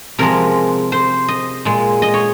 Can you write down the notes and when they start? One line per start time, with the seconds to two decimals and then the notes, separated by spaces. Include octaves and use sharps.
0.18 C3 F3 G#3 A#4
0.92 C5
1.28 D#5
1.65 A#2 G#3
2.02 D#5
2.14 C#5